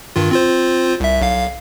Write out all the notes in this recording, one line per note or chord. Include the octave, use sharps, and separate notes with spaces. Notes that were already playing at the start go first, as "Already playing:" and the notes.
G2 D#3 F4
C4 F4 C5
C2 E5
B1 F5